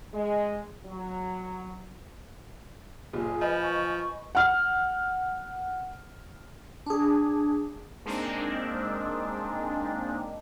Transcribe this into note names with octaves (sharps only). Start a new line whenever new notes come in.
G#3
F#3
F#1 A#2 G#4
F3 B4 D#5 G#5
C#6
F#5 F6
D4 G#4
G#3 A#3 C4 D4 D#4